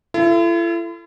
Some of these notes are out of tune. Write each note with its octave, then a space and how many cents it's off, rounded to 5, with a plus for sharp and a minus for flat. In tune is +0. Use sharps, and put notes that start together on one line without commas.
E4 +45 A4 +0